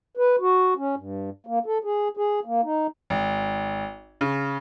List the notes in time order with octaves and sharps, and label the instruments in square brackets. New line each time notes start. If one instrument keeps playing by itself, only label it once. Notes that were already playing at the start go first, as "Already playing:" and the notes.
[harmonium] B4
F#4
C#4
G2
A#3
A4
G#4
G#4
A#3
D#4
[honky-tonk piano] G#1
C#3